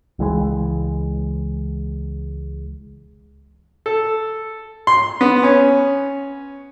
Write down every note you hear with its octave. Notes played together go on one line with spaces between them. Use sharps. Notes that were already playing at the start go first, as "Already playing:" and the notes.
C#2 E3 G#3
A4
C6
B3
C#4